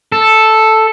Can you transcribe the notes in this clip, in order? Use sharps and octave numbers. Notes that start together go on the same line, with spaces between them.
A4